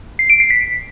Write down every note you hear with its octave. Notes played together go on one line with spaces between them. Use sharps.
C7
D7
C7
B6